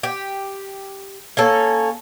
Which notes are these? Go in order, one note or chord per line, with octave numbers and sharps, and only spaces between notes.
G4
A#3 C#4 A4